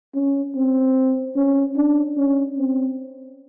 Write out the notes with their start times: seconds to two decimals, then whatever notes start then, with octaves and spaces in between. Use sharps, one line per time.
0.14 C#4
0.55 C4
1.36 C#4
1.76 D4
2.18 C#4
2.58 C4